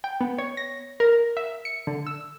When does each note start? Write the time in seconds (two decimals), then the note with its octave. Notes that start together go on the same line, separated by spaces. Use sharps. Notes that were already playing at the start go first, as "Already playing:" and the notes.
0.04 G5
0.21 B3
0.38 C#5
0.57 A#6
1.00 A#4
1.37 E5
1.65 C#7
1.87 D3
2.07 E6